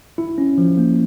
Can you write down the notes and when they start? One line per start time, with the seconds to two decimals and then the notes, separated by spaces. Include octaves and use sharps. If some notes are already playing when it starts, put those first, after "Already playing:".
0.18 E4
0.38 C#4
0.58 F3
0.77 A#3